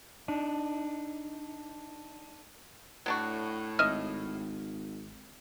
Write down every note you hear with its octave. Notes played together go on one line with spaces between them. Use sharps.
D4 D#4
A2 F#3 D4 F#4
G#1 D#5 E5 F6